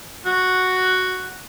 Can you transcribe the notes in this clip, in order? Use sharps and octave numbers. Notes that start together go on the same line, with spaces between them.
F#4